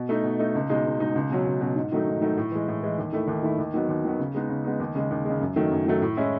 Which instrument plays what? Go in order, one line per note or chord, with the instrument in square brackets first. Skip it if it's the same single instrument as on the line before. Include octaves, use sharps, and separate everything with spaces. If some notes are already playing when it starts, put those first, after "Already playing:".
Already playing: [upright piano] B2
A3 D#4
B2
A3 D#4
C#2
B2 G#3 D#4
C#2
B2 G#3 D#4
C#2
B2 F#3 C#4
C#2
B2 F#3 C#4
G#2
D#3 F#3 A3 D#4
G#2
D#3 F#3 A3 D#4
A2
E3 G#3
A2
E3 G#3
D#2
D#3 A3 E4
D#2
D#3 A3 E4
D#2
D#3 F#3 B3
D#2
D#3 F#3 B3
C#3
G#3 B3 D#4
C#3
G#3 B3 D#4
D#2
C#3 G#3
D#2
C#3 G#3
F#2
D#3 F#3 A3
F#2
D#3 F#3 A3
A2
G#3 C#4 E4